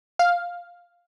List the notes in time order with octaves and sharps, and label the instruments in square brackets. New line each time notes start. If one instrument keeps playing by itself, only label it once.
[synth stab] F5